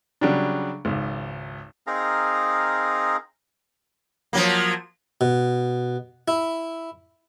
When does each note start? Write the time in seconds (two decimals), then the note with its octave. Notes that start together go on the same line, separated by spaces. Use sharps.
0.21 C#3 F#3 G3 D4
0.85 G#1 C#2
1.87 C4 D#4 G#4 A#4 F5 A#5
4.33 F3 F#3 A#3
5.21 B2
6.28 E4